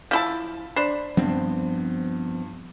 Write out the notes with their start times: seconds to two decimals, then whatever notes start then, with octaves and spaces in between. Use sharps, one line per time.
0.11 F3 E4 A5
0.76 D4 C5 B5
1.17 G2 F3 B3 C4